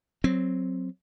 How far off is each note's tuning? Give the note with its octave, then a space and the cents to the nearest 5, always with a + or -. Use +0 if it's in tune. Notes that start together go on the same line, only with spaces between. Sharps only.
F#3 +0 C4 +0